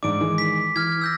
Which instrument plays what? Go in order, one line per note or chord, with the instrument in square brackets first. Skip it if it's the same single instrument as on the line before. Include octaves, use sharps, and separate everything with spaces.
[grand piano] G#2 D4 [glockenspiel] D6 D7
[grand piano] D#3 E3 G#3
[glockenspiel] B6
[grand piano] E3 [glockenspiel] F6 G#6
[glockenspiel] E6 G6 A#6